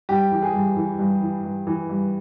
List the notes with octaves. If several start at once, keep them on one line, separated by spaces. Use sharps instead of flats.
G2 G4
E3
G#4
G2
E3
G2
E3
G2
E3
G2